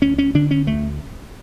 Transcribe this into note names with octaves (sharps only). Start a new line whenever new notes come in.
D2 C#4
C#4
D3 D4
C#4
D2 A3